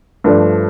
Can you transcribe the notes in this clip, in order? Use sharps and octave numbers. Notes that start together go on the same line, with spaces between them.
G2 F3 A3 D4